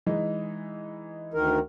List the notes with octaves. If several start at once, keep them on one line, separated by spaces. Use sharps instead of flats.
E3 G#3 D#4
D2 D#3 A#4